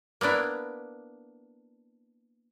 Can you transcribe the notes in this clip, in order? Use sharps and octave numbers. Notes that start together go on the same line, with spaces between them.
A#3 B3 D4 E4